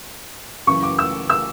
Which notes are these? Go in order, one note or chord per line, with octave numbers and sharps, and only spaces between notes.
F#2 C#3 E3 C#6
D6
E6
E6